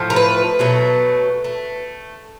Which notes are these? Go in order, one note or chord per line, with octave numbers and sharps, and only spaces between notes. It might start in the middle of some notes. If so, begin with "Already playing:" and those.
Already playing: A2 F3 A3
A#4
B4
B2 F#3 A3
A3